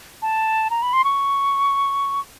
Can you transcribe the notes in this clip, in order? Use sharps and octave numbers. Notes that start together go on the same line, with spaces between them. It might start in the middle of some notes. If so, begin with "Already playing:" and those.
A5
A#5
B5
C6
C#6